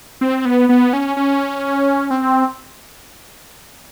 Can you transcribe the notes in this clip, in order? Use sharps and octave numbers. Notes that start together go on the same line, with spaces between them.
C4
B3
B3
C#4
C#4
C4